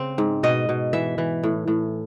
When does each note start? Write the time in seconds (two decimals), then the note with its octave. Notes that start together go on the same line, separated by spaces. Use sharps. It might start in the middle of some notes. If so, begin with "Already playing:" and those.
Already playing: C#3 C4
0.18 G#2
0.43 B2 D#5
0.69 B2
0.93 E3 E5
1.18 E3
1.43 A2
1.68 A2